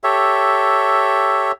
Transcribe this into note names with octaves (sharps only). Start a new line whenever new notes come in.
G4 A4 C#5 E5